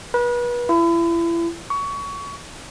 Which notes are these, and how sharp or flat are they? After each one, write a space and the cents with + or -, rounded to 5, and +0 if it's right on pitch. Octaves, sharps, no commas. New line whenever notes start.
B4 -35
E4 +35
C#6 +25